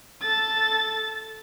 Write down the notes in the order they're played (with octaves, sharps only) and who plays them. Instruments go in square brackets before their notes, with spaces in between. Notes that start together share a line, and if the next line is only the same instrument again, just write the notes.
[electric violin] A4 A6